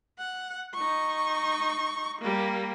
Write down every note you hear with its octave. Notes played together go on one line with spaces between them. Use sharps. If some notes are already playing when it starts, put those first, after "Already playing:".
F#5
D#4 C#6
G3 A#3